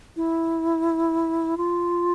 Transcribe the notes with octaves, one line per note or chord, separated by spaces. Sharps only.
E4
F4